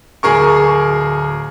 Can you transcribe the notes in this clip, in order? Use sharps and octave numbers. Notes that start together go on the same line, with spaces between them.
D1 G#4 A#4 C#6